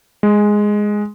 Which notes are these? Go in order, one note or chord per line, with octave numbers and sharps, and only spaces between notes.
G#3